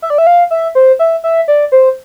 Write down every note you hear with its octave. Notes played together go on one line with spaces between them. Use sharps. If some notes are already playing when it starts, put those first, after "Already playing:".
E5
D5
E5
F5
E5
C5
E5
E5
D5
C5